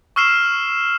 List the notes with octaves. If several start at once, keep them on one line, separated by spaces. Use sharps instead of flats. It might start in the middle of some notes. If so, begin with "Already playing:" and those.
C#6 E6 F6 C7 E7